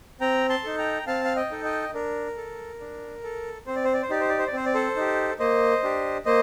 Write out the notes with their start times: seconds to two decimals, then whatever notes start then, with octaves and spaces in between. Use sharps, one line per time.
0.21 C4 G5 A#5
0.49 A5 C6
0.64 D#4 A4
0.78 G5 A#5
1.07 C4 F5 A5
1.25 F5
1.36 D#5 G5
1.51 D#4 A4
1.65 D#5 G5
1.93 D4 A#4
2.37 A4
2.80 D4
3.24 A4
3.66 C4 C5
3.76 D5
3.84 C5
3.93 D5
4.02 C5
4.10 D#4 G4 D5
4.20 C5
4.29 D5
4.38 C5
4.47 D5
4.53 C4 C5
4.65 D5
4.74 A4 C5
4.96 D#4 G4
5.39 A#3 C5 D#5
5.83 D4 G4
6.26 A#3 C5 D#5